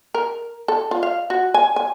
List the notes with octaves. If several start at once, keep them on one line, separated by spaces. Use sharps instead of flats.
A#4
A4
F4
F5
F#4
G#5
G#5